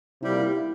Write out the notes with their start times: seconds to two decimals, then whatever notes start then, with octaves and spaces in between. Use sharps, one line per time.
0.22 C3 G3 A#3 E4
0.33 F4
0.42 E4
0.54 E4